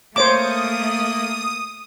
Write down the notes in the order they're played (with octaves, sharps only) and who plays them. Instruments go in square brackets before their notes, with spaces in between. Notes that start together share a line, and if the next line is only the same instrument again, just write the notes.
[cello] A3 [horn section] A#3 [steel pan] C5 C#5 D6 [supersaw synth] D#6